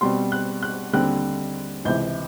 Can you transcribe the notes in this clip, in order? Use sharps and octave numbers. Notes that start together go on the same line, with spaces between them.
B2 G3 C4 C6
F#6
F#6
D#2 D3 G3 C4 F#6
C#2 C3 E3 G6